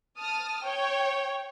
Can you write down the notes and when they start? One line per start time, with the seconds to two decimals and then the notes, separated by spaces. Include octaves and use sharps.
0.18 A5 D#6 F6
0.64 C#5 G5